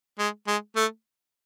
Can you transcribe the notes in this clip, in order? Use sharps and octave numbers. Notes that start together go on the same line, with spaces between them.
G#3
G#3
A3